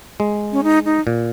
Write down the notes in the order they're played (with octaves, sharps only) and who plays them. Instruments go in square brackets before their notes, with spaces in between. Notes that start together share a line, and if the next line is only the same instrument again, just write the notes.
[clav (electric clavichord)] G#3
[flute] C#4
D#4
D#4
[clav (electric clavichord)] A#2